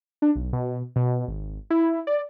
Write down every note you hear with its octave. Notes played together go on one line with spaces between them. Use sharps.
D4
B1
B2
B2
G#1
E4
D5